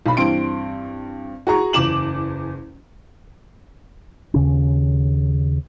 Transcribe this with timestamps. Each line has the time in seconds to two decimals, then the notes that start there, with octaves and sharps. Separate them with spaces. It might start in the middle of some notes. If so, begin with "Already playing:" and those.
0.06 B1 B5
0.17 G2 E3 C4 C6 D7
1.47 F#4 G#4 A#5 C#6
1.73 F#1 E2 D6 E7 F#7
4.34 D#2 C#3 C#4